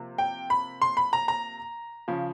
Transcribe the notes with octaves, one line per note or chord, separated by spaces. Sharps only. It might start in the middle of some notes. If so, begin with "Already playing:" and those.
Already playing: C3 F3 A#3
G5
B5
C6
B5
A#5
A#5
C#3 F3